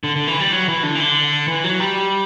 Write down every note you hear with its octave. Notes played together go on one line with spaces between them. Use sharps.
D3
D3
E3
G3
F#3
E3
D3
E3
D3
E3
F#3
G3